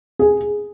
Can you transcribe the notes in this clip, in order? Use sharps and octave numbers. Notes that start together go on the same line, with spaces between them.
G#4